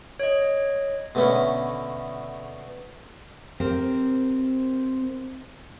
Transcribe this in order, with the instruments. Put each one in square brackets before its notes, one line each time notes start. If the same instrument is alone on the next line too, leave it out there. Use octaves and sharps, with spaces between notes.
[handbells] C#5 D#5
[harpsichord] B2 D3 A3 B3 C#4
[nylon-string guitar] C4 G4 A#4 C5